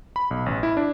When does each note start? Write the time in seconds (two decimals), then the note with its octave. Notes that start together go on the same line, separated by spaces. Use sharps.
0.16 B5
0.31 B1
0.46 A1
0.63 E4
0.77 D4